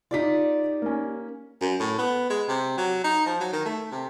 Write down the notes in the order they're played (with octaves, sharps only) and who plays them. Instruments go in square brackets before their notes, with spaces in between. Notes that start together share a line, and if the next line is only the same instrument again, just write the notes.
[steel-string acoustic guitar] D#4 G4 D5 [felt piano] F4 B6
[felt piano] A#3 C#4
[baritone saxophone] F#2
A2
B3
G#3
C3
F#3
D#4
F3
F#3
D#3
A3
C3